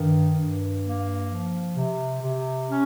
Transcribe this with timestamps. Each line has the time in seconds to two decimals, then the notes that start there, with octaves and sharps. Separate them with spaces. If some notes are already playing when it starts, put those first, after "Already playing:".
Already playing: G2 D#3
0.35 G2
0.82 A#3
1.29 F3
1.75 C3
2.22 C3
2.69 C#4